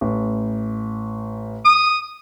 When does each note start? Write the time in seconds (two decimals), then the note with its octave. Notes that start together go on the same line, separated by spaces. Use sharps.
0.01 A1
1.65 D#6